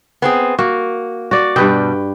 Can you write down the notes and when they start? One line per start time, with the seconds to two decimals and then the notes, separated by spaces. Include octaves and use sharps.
0.22 B3 C4 G#4
0.59 A#3 F#4
1.31 F#4 D5
1.56 G2 B2 G3 B4 G5